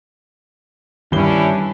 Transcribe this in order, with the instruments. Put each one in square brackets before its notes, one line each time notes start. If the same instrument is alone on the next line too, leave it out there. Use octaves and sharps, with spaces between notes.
[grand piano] G2 G7 [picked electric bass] D#3 [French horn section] C#4 D4 E4